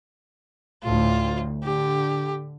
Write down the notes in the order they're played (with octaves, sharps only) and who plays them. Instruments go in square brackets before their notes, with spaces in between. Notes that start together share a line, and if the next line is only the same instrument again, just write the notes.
[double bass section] D2 A2 [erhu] F4
[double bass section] D3 [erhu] G4